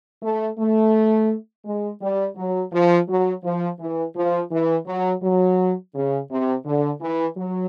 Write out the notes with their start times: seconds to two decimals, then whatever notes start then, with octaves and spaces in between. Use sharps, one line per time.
0.22 A3
0.58 A3
1.65 G#3
2.01 G3
2.36 F#3
2.72 F3
3.08 F#3
3.43 F3
3.79 E3
4.15 F3
4.51 E3
4.86 F#3
5.22 F#3
5.94 C#3
6.30 C3
6.65 D3
7.01 E3
7.36 F#3